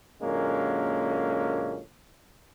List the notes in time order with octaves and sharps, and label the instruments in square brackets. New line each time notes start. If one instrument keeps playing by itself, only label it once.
[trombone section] F#2 A#2 D3 G#3 A#3 C#4